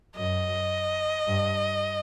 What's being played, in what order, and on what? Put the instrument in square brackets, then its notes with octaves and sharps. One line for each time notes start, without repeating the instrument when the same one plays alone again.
[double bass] F#2 [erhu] D#5
[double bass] G2